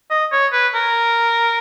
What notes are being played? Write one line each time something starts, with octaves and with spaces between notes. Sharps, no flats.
D#5
C#5
B4
A#4